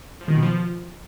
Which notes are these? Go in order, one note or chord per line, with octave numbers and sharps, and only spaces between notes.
F3
D#3
B2
F3